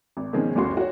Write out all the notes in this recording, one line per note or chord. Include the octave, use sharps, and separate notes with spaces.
G#1
B2 D#3 F3 G#3 C4 C#4
G1 D#2 C#4 F#4 C6 C#6
F#4 C#5